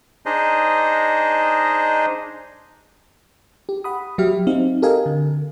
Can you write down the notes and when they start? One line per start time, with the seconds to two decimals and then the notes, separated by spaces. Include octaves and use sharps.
0.26 D4 D#4 G#4 C5 D#5
3.69 G4
3.84 F#5 B5 D#6
4.18 F#3 F#4 G4 E5 F6
4.47 C4 D#4 F5
4.82 G4 A4 A#4 D#5 F5 G#5
5.06 D3